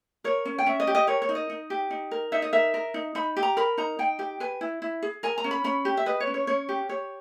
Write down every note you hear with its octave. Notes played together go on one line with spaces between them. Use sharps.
A#4 C#5
C#4
G5
C#4 E5
D#5
G4
D#5
A#4 C#5
C#5
D#4
D#5
D#4
G4
D#4
A#4
D#4 E5
D#5
A#4 E5
A#4
D#4
D#4 B5
G4
A#5
A#4 B5
D#4 A#5
D#4 G5
G4 G5
B4 G#5
E4
E4
G#4
A#4 G#5
A#5
C#4
B5
C#4 B5
G4
E5
B4 D#5
C#5
C#4
C#5
C#4 C#5
G4
G4 C#5